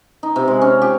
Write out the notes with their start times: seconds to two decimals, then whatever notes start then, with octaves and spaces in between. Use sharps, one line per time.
0.23 D#4
0.36 C3
0.48 G#3
0.61 C#4
0.82 G4